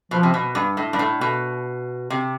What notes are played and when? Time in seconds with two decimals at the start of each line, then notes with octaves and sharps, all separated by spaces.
0.11 B2 F3
0.23 C3
0.34 B2
0.55 G2
0.77 A2
0.93 G2
0.99 A2
1.21 B2
2.10 C3